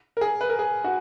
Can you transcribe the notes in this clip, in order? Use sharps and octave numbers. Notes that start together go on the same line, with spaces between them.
A#4
G#4
B4
A#4
G#4
F#4